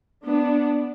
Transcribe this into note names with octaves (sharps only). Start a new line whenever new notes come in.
B3 D4